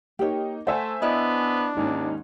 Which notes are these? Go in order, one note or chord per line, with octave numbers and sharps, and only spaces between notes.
A#3 D#4 G4 C#5
A3 C5 E5 F#5 G#5
B3 D4 E4 D5 D#5
D#2 G#2 C#4